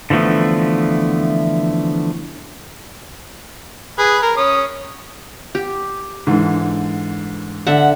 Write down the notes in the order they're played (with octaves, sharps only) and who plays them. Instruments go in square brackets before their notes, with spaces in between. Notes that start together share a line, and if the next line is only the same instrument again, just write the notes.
[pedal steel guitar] D3 E3 F3 A3 B3
[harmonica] G#4 B4
A#4
C#4 D#6
[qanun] G4
[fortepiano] G#2 D3 E3
[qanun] D3 E5 F#5